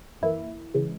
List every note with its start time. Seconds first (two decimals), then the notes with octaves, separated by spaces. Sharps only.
0.22 F#2 E3 A#3 E4
0.74 C#3 E3 G#3